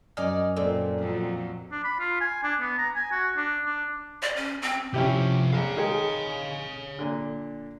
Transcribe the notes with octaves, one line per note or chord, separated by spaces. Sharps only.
F#2 D#4 D5 G#5 F6
A#2 C4 A4 D5
F2 A#2 F#3
D4
B5
F4
G#5
D4
B3
A#5
G#5
F#4
D4
D4
D5
C#4
C4
C3 F3 C#4 E4 G4
A#1 C#5 F5
D#3 G#3 G#4
A#2 D3